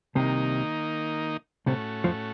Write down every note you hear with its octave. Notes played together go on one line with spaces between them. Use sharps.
C2 C3 D#3 A#3 D#4
C2 A2 C3 A3 C#4 F#4
F2 F3